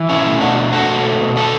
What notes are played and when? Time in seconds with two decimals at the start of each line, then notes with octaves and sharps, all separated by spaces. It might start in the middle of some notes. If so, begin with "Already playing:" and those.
Already playing: E3
0.09 B2 C#4 E4
0.26 A3
0.41 B2 D4 F#4
0.57 A3
0.73 A3 F#4 A4
0.89 B2
1.05 A3
1.21 B2
1.36 D3 F#4 A4